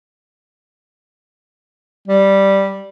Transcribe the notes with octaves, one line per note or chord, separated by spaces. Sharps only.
G3